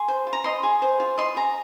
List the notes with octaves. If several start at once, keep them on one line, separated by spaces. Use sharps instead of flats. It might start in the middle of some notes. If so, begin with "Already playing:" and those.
Already playing: G#4 C6
C5
F4
A#5
D#5 C6
G#4
C5
F4
D#5 C6
G#4 A#5